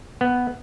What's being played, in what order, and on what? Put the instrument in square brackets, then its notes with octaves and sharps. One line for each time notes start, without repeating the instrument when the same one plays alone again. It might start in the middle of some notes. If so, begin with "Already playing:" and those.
[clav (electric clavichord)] B3